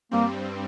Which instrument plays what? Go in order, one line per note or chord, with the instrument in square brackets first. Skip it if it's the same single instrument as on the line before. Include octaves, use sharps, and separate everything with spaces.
[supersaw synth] G2 G3 C4 [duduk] A#3